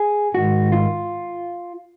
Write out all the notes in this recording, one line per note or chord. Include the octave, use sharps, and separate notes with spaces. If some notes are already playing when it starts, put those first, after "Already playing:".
Already playing: G#4
G#2 D#3 G#3 F#4
F4